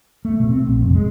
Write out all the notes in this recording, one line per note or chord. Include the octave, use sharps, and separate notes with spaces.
A3
B2
C4
A#1
F1
G#3